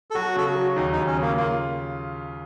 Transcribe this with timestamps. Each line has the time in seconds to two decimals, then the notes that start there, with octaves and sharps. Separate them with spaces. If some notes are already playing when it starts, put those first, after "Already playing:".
0.11 A4
0.15 F#3 F#4
0.36 C#3 A4
0.46 F#4
0.55 F#3
0.76 D#2 D#4
0.92 D#4
0.97 D#2
1.07 C#4
1.17 C#3 A#3
1.37 A#3 F4